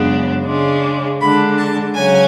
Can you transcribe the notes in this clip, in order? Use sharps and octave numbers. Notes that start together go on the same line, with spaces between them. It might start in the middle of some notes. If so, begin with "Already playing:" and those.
Already playing: F#2 C#3 G#3 B3 D4
C#3 G#3 D4
D3 G#3 D4 B5
A5
C#3 F#3 C#4 G#5